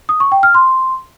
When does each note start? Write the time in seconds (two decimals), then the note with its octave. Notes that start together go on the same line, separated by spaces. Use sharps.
0.09 D#6
0.20 C#6
0.32 G5
0.43 F6
0.55 C6